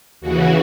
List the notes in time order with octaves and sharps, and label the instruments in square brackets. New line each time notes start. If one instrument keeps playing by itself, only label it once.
[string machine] D#2 C#3 E3 F#4